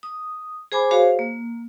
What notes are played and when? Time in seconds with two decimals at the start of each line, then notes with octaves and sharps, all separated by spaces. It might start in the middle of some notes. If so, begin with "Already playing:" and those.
0.03 D#6
0.72 G#4 C5 G#5 B5 D6
0.91 F#4 G#4 C5 C#5 F5
1.19 A#3